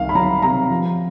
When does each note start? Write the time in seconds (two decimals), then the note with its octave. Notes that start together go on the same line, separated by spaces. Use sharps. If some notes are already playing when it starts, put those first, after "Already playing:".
Already playing: C2 D#3 F5
0.09 B5
0.15 F#3 A#5
0.42 C3 A#5
0.70 F3